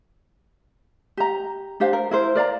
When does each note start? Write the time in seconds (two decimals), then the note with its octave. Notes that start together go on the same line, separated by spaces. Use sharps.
1.17 G4 A#5
1.80 D4 G4 C5 F5
1.93 A#4
2.11 E4 A#4 C5
2.35 A#4 D5 F5 A#5